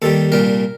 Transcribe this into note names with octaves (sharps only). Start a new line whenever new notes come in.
D#2 D#3 G3 A4
C2 A#2 G3 A#4